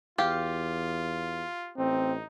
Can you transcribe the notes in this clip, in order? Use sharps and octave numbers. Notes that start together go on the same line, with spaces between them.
E2 F4 G4 F5
A1 C4 D#4